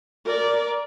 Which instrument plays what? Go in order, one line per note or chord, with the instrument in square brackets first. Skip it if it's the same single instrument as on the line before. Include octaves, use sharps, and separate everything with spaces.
[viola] A#4 D5